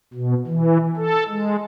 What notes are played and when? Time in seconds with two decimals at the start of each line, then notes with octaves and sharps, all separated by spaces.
0.14 B2
0.47 E3
0.97 A4
1.29 G#3